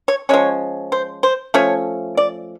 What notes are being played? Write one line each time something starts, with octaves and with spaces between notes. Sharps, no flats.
C#5
F3 G#3 C#4 C#5
C5
C5
F3 A3 C#4 C#5
D5